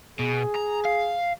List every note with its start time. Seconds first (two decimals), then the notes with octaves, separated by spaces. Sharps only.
0.19 B2 G#4
0.55 A#5
0.85 F5